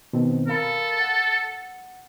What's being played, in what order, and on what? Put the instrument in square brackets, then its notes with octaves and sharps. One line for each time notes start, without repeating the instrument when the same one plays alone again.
[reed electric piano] B2 D#3 C4
[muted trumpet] A4 [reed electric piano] A#4 F5 B5
[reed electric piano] F#5